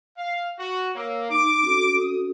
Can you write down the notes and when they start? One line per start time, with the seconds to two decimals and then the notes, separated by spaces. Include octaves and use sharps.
0.18 F5
0.59 F#4
0.95 A#3 C#5 E6
1.30 D#4 D6
1.63 C#4 F#4 A4
2.00 D#6